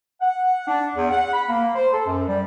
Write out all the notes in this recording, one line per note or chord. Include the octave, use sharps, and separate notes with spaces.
F#5
D4
E2
F#5
B5
A#3
C5
A4
F#2
G3